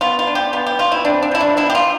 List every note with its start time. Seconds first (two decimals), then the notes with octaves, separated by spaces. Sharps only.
0.01 B3 F4
0.19 F4
0.27 D4
0.35 G4
0.53 B3 F4
0.67 G4
0.79 B2 F4
0.92 E4
1.05 C4 D4
1.22 D4
1.31 F3 E4
1.41 D4
1.57 B3 E4
1.70 G4
1.75 F4